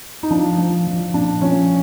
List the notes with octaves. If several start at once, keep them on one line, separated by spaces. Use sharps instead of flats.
D#4
F3 D4
F3
F3
A#2 D4
F3 C#4